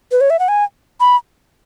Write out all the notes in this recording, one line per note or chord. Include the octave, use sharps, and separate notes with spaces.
B4
C#5
E5
F#5
G#5
B5